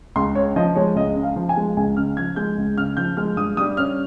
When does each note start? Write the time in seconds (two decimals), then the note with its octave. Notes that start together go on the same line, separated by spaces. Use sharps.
0.16 C#2 C6
0.35 C#3 C#5
0.56 F3 D#5
0.76 G#3 C#5
0.96 C#2 D#5
1.16 C#3
1.23 F5
1.36 F3
1.49 G#5
1.57 G#3
1.77 C#2 G#5
1.97 C#3 F6
2.17 F3 G#6
2.36 G#3 G6
2.58 C#2
2.77 C#3 F6
2.97 F3 G6
3.17 G#3 F6
3.37 G2 D#6
3.57 G3 D#6
3.77 C#4 F6